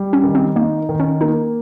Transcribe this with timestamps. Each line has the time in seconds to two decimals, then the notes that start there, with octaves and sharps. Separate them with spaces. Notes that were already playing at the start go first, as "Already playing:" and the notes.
Already playing: G3
0.13 C#4
0.23 D#3
0.35 C4
0.56 A#3 D#4
0.89 D#3
1.00 C#4
1.21 A#3 D#4